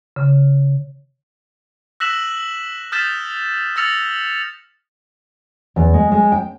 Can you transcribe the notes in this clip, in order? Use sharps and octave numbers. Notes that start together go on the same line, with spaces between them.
C#3
E6 F#6 A#6 B6 E7 F#7
D#6 F6 G6 A6 B6 E7
E6 F6 A6 A#6 C#7 F7
E2
G#3
G#3
G5